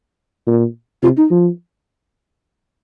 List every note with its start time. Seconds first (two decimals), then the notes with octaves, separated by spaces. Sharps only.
0.47 A#2
1.03 C3 F4
1.17 D#4
1.31 F3